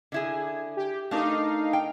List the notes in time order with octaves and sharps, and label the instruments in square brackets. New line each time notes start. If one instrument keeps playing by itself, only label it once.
[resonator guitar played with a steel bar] D3 E4 G#4
[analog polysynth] G4
[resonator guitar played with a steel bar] A3 D4 A#4 [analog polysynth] D#4 F5
[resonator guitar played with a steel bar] G5